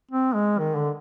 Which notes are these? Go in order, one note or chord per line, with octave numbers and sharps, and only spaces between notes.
C4
G#3
D#3
D3